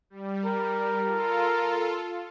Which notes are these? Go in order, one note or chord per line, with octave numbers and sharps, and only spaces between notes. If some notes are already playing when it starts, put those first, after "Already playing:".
G3
A#4
F4 A4